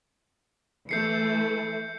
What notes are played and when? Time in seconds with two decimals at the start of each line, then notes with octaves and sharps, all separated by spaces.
0.89 E3 A3 G6 C7 C#7